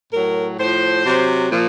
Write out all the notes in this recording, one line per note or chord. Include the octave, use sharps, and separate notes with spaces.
A2 F#3 A#4
A2 F3 C5
C3 F#3
A#2 F3